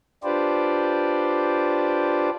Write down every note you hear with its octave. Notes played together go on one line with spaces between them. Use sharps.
D4 F4 G4 B4 C5 D5